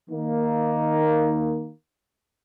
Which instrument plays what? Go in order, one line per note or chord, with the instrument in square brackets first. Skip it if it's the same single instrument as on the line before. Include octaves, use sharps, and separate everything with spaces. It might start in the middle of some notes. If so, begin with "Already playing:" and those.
[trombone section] D#3 A#3